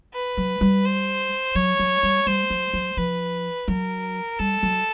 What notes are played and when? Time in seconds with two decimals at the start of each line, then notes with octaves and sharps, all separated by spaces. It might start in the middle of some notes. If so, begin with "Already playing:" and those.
0.14 B4
0.37 F#3
0.61 G3
0.85 C5
1.55 F#3 C#5
1.79 F#3
2.03 G3
2.27 G3 C5
2.50 F#3
2.73 F#3
2.97 F3 B4
3.68 F#3 A#4
4.39 G3 A4
4.63 F#3